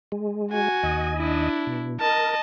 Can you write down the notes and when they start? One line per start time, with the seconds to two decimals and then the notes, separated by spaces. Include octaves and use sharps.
0.12 G#3
0.52 F#4 G#5
0.83 D#2 D#5
1.17 D4 E4
1.67 B2
2.01 A#4 D#5 A5